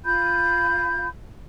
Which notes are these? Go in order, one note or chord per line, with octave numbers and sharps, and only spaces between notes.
F4 F5 B5 G6